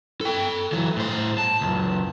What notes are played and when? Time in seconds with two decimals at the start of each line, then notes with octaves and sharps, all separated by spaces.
0.21 A4 G5
0.72 E3 F#3
0.96 A2 C5
1.38 A5
1.61 C#2 F#2